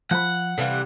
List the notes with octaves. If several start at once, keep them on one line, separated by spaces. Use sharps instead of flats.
F3 F#5 B5
C3 E3 G3 A4 F5